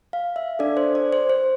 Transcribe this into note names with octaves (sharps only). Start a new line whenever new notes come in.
F5
E5
D4 A4 D5
C5
D5
C5
C5